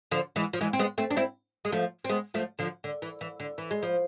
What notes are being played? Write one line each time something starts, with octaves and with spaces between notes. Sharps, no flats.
D3 F3
E3 G#3
F3
E3 G#3
C4
G#3 B3
A3 C4
D4
C4 E4
G#3
F3 A3
C4
G#3 B3
F3 A3
D3 F3
D3
E3
E3
D3
E3
G#3
F3